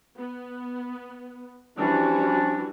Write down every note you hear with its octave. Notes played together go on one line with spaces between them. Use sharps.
B3
E3 F3 G3 C#4 D4 F#4